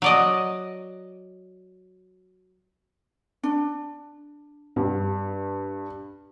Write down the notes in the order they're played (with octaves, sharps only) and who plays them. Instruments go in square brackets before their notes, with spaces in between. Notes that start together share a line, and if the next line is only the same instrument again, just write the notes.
[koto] F#3 D5 D#5
[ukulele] D4
[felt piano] G2